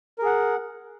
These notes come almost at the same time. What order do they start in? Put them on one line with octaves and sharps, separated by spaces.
A#4 G#4 F#5